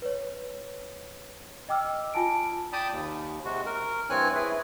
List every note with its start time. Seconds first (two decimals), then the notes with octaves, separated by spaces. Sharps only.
0.02 B4 C#5
1.69 D#5 G5 D6 E6 F6
2.14 F4 G#5 A5 D7
2.73 D5 G5 A5 B5 D#6
2.92 D#2
3.45 C3 G#3 F#4
3.66 A#4
4.10 G2 E3 C4 C#5 G#5 F#6
4.35 E4 G#4 B4